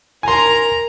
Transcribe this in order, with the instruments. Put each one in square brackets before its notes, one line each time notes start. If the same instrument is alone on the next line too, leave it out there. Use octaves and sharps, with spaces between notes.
[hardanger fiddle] A#4 A#5 [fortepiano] G#5 C6